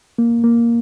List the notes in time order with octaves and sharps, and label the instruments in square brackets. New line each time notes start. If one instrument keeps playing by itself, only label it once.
[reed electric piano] A#3
A#3